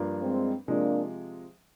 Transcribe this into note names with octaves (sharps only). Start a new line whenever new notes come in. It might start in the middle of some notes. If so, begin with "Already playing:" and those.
Already playing: G2 F3 A#3 D4
G#3 C4
C3 F3 G#3 A#3 D4